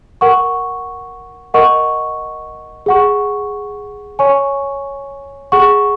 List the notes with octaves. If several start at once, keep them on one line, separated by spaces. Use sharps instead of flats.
A#4 F#5 C#6
A#4 D#5 F#5 C#6
G#4 F#5 C#6
C#5 G#5 C#6
G#4 F#5 C#6